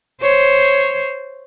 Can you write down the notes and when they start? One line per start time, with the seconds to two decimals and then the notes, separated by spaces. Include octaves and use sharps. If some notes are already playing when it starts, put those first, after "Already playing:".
0.22 C5 C#5